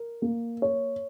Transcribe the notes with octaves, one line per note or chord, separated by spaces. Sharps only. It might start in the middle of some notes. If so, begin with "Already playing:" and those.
Already playing: A#4
A#3
C#5